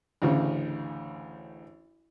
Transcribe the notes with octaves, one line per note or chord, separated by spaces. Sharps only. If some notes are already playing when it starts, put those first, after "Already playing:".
A1 D2 C#3